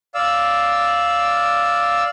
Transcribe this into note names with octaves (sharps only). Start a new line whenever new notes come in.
D5 F5 E6